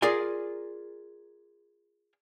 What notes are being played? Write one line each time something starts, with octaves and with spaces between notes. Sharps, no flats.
F4 G#4 A#4 D5 G#5